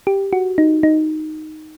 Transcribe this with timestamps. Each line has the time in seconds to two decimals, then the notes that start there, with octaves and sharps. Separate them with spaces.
0.07 G4
0.33 F#4
0.58 D#4
0.83 D#4